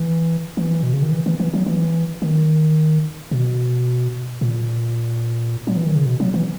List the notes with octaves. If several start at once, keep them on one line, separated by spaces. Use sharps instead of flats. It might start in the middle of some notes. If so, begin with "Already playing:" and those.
Already playing: E3
E3
B2
C#3
D#3
E3
E3
E3
F#3
E3
D#3
B2
A#2
F#3
E3
D#3
C#3
B2
F#3
E3